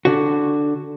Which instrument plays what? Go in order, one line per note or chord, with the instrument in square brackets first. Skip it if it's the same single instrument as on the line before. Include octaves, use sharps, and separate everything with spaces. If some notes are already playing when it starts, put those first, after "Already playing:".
[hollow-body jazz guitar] D3 F#4